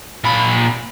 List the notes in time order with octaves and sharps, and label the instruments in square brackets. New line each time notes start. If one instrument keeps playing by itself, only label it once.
[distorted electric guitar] A#2 B5